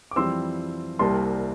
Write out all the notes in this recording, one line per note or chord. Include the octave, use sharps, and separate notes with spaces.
D6
F2 E3 G3 C4 C6 E6
C2 C3 G3 A#3 A5 C6